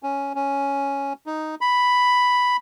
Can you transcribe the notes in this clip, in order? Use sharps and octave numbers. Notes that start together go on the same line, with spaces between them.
C#4
C#4
D#4
B5